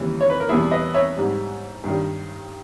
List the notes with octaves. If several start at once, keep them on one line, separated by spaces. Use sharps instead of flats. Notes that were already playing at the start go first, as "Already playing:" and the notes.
Already playing: D#2 C#3 E3 G3
C#5
B4
A#4
E2 B2 G3 E4 G#4
B4 D#5
C#5 E5
G#2 G3
G2 D#3 G3